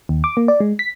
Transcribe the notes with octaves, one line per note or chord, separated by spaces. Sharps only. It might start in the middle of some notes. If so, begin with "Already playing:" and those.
D#2
D6
A#3
D5
G#3
B6